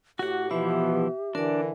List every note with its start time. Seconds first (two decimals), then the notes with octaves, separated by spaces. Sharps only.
0.19 A2 F#4 G4 F#5
0.51 B2 E3 F3 B3 E4 E5
1.35 D3 E3 D4 A#4 D5